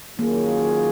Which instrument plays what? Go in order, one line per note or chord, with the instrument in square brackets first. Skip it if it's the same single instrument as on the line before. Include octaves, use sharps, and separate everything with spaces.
[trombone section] D#3 F#3 C#4 F4 G#4 [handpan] A#3